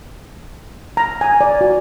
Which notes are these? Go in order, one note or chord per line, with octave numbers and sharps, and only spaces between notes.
A#5
G#5
D5
F#4